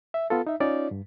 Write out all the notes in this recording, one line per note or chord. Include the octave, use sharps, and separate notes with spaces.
E5
B3 F4 A4
D#4 E5
C#4 D#4 F4 C#5 D5
G2